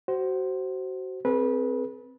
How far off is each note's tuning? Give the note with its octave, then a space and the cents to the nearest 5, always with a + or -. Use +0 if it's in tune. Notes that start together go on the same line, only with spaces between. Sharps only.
F#4 +30 C5 +0
C4 +0 G#4 +35 B4 -20